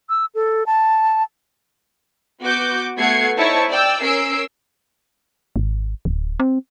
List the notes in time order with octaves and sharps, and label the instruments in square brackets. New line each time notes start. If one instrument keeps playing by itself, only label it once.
[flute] E6
A4
A5
[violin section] B3 F#4 D6 G6
A3 B3 F#4 G#6 C7 C#7
D#4 E4 C5 C#5 A5 C#6
D5 G5 E6
C#4 A#4 E6 C7 D7
[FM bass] G#1
D1
C4